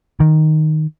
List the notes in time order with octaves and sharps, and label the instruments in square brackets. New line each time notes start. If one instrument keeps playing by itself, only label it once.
[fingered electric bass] D#3